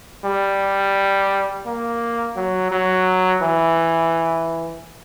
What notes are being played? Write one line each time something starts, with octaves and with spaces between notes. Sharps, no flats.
G3
A#3
F#3
F#3
E3